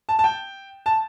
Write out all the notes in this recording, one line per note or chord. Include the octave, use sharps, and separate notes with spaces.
A5
A5
G5
A5